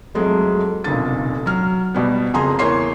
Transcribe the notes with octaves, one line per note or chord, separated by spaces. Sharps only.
F2 F#3 G#3 A3
F1 B1 A#2 D3 A6
F#3 F6
B2 G3 B3
F#1 F2 G#4 G#5 A#5 C6
E2 E3 A#3 C#5 C6 C7